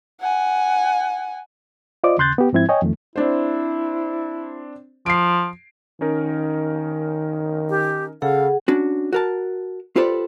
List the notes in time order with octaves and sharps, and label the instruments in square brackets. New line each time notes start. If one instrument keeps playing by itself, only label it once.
[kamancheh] F#5 G#5
[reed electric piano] F4 C5 D5 D#5 D6
D#2 C#3 C6 F#6 G6 A6
B3 G4
G#2 F3 C4 E4 G#6
C#5 D#5 G5 G#5
F2 D#3 A3
[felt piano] C4 D4 C5 [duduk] E4
[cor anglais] F3 [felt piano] C7 D7
[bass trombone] D#3 [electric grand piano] C#4 D#4 A#4
[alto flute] G4
[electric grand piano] C#3 A4 [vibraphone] G#4 F#5 [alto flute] F5
[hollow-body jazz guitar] C#4 D4 F#4
F#4 A#4 A5
F4 G4 A4 B4 C5 D5